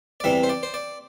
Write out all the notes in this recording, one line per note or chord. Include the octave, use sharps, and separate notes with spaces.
D5
E2 C3 E3 G3 E5
C5
D5
C5
D5